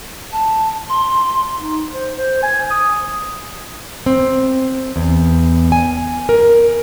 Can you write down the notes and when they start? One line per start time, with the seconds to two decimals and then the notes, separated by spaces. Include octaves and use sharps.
0.32 A5
0.89 C6
1.58 D#4
1.92 C5
2.17 C5
2.43 G#5
2.70 D#6
4.06 C4
4.96 E2
5.72 G#5
6.29 A#4